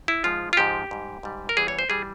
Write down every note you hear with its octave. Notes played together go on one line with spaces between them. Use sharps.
E4
G#2 F3 G#3 F4
F4
G#2 F3 G#3 G4
G#2 G3
G#2 G3
A#4
E2 E3 G3 G#4
C#5
C5
E3 G3 G#4